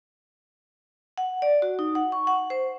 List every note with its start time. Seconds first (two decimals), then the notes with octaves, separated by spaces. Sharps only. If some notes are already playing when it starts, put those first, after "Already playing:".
1.18 F#5
1.42 D5
1.62 F#4
1.79 D#4
1.95 F#5
2.12 C#6
2.27 F#5
2.50 C5